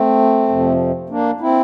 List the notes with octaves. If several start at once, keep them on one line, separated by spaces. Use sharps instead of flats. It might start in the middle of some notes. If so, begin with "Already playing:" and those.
Already playing: A3 C4
F2 C3 F3
A#3 D4
C4 E4